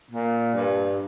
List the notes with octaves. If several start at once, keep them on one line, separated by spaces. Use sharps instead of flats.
A#2
G2